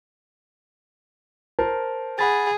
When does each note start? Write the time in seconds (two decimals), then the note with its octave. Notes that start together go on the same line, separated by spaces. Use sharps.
1.59 A#4 C5 A5
2.19 G#4 F#5 B5 A6